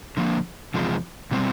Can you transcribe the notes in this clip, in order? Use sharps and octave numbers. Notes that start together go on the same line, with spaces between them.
D3 F3 A#3
E2 C3 F3 G#3
B2 G3 C4